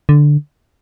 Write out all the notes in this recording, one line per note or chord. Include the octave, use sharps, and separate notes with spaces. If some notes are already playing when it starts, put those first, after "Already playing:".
D3